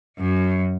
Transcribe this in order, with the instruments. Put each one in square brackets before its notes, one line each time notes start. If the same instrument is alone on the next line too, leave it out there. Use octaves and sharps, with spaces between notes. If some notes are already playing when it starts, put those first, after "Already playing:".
[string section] F#2